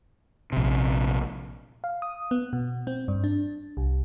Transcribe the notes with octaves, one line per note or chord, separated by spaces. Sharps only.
A#1 C3
F5
D#6
B3
B2
C4
G2
D4
C2